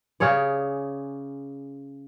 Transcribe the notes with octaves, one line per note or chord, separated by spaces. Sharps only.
C#3 G#4 C#5 D5